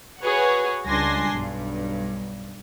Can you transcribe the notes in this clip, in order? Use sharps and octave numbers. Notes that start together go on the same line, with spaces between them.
F#4 G#4 B4 C#5 F#5
C#2 G3 D4 G#5 C6 A#6
B1 G2